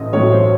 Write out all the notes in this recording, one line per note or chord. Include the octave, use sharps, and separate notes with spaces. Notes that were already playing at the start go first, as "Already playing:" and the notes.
Already playing: A1 A2 D#5
A1 A2 F#3 C#5
C5